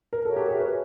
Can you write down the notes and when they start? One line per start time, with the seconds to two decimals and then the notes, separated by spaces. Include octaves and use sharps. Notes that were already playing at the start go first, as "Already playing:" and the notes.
0.13 A#4
0.25 F#4 A4 A#4 C#5 E5
0.36 G4
0.49 G#4
0.60 B4